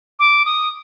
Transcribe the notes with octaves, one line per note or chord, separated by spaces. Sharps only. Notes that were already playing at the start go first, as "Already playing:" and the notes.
D6
D#6